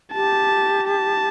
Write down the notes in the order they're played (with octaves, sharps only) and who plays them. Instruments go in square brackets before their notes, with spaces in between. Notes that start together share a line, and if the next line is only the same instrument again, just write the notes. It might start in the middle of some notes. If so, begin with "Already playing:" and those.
[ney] G4 [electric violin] A5
[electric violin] A5